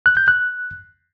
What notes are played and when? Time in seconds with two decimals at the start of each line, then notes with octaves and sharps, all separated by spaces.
0.06 F#6
0.17 G6
0.28 F#6